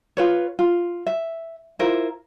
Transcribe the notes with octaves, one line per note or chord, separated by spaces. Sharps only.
F4 B4 C#5
F4
E5
E4 F4 A#4 C5